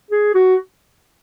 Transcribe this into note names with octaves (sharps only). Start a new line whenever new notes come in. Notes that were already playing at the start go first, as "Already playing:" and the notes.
G#4
F#4